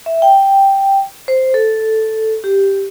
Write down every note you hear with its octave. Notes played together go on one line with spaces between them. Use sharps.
E5
G5
C5
A4
G4